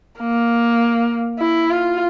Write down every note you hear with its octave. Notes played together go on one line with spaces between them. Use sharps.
A#3
E4
F4